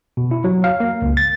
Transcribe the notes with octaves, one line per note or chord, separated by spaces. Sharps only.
B2
E4
F#3
F5
A#3
C#2
A6